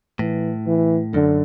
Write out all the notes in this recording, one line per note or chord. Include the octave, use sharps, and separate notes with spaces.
A2 E3
E3
F#2 D3